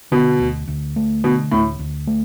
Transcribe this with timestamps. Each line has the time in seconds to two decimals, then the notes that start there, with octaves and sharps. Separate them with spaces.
0.12 B2 D3
0.40 D2
0.68 D2
0.96 A3
1.24 B2 D3
1.52 D2 A2
1.79 D2
2.07 A3